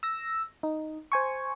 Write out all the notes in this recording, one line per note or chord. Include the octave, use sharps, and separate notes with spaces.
E6 A#6
D#4
C5 G#5 C#6